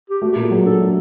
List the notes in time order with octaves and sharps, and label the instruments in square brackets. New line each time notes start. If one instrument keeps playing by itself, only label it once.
[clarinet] G4
[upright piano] A3 [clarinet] F#4
[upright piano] A#2
[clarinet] G#4
[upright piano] F#3
[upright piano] D4 [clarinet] A4
[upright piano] A3